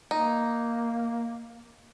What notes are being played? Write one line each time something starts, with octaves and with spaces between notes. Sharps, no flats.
A#3 D#4